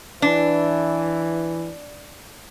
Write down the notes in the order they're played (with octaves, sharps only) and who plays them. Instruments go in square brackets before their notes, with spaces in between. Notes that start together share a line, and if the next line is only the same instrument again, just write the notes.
[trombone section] E3 [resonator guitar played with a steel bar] D4